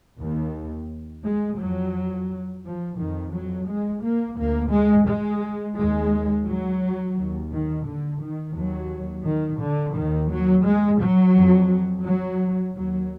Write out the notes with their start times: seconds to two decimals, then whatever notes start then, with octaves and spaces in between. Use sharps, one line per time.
0.20 D#2
1.24 G#3
1.59 F2 F#3
2.64 F3
2.99 F2 D#3
3.34 F#3
3.68 G#3
4.03 A#3
4.38 D2 A#3
4.72 G#3
5.08 G#3
5.78 D#2 G#3
6.47 F#3
7.17 D#2
7.52 D#3
7.86 D3
8.22 D#3
8.56 D#2 F#3
9.25 D#3
9.61 D3
9.96 D#2 D#3
10.30 F#3
10.65 G#3
11.01 F#3
11.35 F2
12.04 F#3
12.75 D#2 F#3